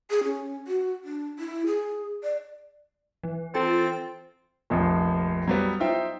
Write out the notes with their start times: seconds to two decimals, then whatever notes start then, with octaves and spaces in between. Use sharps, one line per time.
0.10 G#4
0.24 C#4
0.67 F#4
1.04 D4
1.39 E4
1.67 G#4
2.23 D5
3.23 E3
3.54 C4 F4 A4 A6
4.70 F1 A#1 F2 A#2
5.48 F#3 G3 B3
5.80 D#4 F4 C5 E5 G5